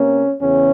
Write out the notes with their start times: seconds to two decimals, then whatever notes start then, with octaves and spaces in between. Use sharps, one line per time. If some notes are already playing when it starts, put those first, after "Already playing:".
Already playing: C3 A#3 C#4
0.41 E2 C#3 C#4